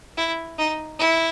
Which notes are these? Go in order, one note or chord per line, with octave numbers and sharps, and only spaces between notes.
E4
D#4
E4